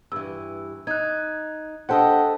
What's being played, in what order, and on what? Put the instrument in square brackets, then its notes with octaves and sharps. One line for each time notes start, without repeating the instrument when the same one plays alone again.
[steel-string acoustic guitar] G2 E3 [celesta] E6
[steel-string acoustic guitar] D#4 [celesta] F#6 G#6
[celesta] D4 G5 [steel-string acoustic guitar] G4 A4 D#5 [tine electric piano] C5 F#5